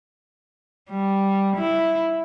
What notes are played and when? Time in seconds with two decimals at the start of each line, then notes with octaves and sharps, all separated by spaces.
0.91 G3
1.56 E4